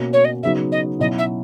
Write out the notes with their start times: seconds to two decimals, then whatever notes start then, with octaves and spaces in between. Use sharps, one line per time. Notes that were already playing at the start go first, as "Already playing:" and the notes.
Already playing: B2 A#3 C#4 F#4
0.13 C#5
0.24 D#5
0.43 C#3 F#3 B3 D#4 F#4 E5
0.72 D#5
0.99 B2 F#3 C#4 E4 D#5
1.18 E5